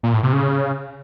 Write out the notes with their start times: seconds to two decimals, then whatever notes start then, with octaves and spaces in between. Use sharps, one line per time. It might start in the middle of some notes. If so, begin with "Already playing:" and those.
0.03 A#2
0.13 A2
0.23 C3
0.33 C#3